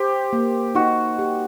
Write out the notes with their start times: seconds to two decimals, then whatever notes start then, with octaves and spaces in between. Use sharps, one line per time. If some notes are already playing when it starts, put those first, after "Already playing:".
Already playing: G4 C5
0.33 A#3
0.75 D#4 F#4
1.19 G4